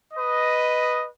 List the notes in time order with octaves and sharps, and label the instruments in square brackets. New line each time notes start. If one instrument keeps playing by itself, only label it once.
[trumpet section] B4 D#5